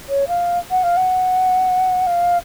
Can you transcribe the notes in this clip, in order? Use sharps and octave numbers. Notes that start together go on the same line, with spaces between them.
C#5
F5
F#5
F5
F#5
F5